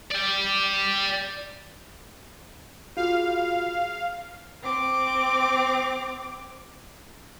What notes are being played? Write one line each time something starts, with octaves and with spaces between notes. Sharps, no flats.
D5 G5
F4 F#4 G#4 F5
C4 D6